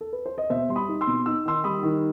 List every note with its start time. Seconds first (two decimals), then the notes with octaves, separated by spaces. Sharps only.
0.01 A4
0.13 B4
0.26 C5
0.38 D#5
0.50 B2 C5 E5
0.69 G3 C6
0.76 B5 D#6
0.89 D#4
1.01 C6 E6
1.07 B2
1.26 D#4 E6
1.46 D#3 C6 E6
1.64 G3 B5 D#6
1.83 D#3